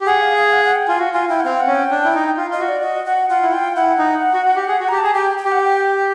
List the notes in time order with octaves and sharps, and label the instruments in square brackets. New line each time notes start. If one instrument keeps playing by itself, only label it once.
[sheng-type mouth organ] G4
[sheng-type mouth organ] G#4 [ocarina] F#5
[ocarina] F5
F5
F#5
F#5
G5
[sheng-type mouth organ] F4 [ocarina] G#5
[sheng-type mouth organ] F#4
[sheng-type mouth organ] F4 [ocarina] G#5
[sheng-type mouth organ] E4 [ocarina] G5
[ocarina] F#5
[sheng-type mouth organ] C4 [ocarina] F5
[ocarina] F#5
[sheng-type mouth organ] C#4
[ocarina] G5
[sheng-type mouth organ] D4
E4
D#4
F4
[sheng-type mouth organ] F4 [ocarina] D#5
[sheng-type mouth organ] F#4
[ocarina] D5
[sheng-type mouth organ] F#4 [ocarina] D#5
[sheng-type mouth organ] F#4 [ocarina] F#5
[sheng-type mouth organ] F4 [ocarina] F#5
[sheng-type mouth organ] E4
[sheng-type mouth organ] F4 [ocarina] G5
[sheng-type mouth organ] E4 [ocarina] F#5
[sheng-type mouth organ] D#4
F#4
F#4
G4
G#4
F#4
[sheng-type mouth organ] G4 [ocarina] A#5
[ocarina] A5
[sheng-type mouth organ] G#4
[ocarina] G#5
[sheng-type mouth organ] G4 [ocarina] G5
[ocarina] G5
[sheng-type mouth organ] G4
[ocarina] F#5
G5